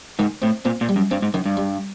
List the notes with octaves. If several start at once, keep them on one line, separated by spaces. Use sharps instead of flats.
G#2 D#3
A2 C4
A#2 C4
A#2
G3
F#2
G2 C4
G#2
F#2 D#3
G2
G3